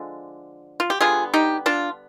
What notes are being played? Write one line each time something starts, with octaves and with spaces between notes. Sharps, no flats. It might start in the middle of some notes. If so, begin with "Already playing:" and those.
Already playing: D3 F3 G#3
F4
G4
D3 G3 B3 F4 G#4
D#4 G4
D4 F4